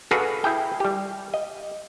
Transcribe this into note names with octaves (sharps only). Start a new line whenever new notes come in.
F#4 G#4 A4 B4 D5 F5
E4 G#4 G5
G3 G4
D#5